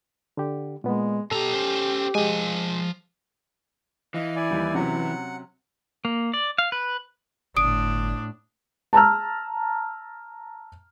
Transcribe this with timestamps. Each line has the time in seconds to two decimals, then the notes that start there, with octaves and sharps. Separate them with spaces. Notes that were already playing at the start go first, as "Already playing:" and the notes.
0.37 D3 G4
0.84 A#2 G#3 B3
1.31 B2 G4 A4 A#5
1.54 C#4 C5
2.15 F3 G#3 G#5
4.14 E3 D#5 F5
4.36 E4 D5 G#5
4.51 D#2 G3
4.75 C3 F#3 C#4 F#5
6.05 A#3
6.34 D5
6.58 F5
6.72 B4
7.57 G1 A2 D4 D#6 D7
8.93 A5 A#5 E6 F6